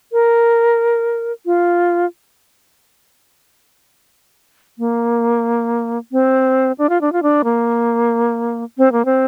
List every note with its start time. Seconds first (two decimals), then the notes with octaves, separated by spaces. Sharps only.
0.13 A#4
1.46 F4
4.78 A#3
6.12 C4
6.78 D4
6.89 F4
7.01 D4
7.13 F4
7.23 D4
7.44 A#3
8.78 C4
8.92 A#3
9.05 C4